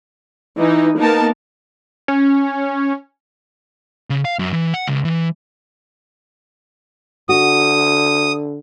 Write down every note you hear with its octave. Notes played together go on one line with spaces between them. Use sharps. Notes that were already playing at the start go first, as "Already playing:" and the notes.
E3 D#4
A#3 B3 D#4 A#4 A5
C#4
C#3
F5
F#2
E3
F#5
C#2
E3
D3 F#4 D#6